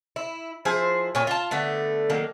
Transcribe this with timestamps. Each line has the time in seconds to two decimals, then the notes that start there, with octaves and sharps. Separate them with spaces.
0.16 E4
0.65 F3 E4 G#4 C5
1.15 A#2 C#5 G#5
1.27 F4 A5
1.51 D3 A3 B3
2.10 D#3 F#3 A#3